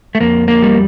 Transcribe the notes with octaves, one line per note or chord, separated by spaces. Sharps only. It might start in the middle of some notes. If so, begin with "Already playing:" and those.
A3
F2 A#3
A#3
G3